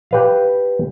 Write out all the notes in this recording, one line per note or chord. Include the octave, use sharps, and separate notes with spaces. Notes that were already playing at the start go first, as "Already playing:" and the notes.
G4 B4 F5